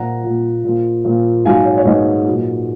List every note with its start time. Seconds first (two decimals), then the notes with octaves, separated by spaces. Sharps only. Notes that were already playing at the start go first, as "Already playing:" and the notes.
Already playing: A#2 F3 F#5 A#5
0.24 A#2 F3
0.64 A#2 F3
1.05 A#2 F3
1.45 G#2 F#3 F5 G#5
1.65 C#5
1.77 C#5
1.85 G#2 F#3 B4 D#5
2.27 A#2 F#3